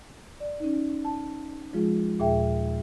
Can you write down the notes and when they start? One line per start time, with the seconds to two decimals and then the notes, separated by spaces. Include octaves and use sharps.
0.40 D5
0.60 C#4 D#4
1.05 A5
1.73 F3 G#3 F4 G#4
2.19 D#2 A#2 G#4 E5 G5